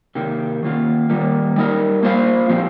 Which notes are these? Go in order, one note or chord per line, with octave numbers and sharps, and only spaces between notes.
C3 D#3 A#3 G4
D#3 A#3 F4
D#3 G3 A#3
G3 D#4 A#4
A#3 F4 C5 F5
A#2 F3 C4 G4